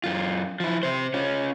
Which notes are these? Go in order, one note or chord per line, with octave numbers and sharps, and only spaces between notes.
F#2 F4
F3 E4
C3 C5
C#4 F4